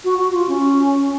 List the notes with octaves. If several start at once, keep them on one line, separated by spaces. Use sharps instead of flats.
F#4
F#4
F4
C#4